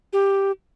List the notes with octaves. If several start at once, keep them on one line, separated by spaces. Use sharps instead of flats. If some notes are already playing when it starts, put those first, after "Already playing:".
G4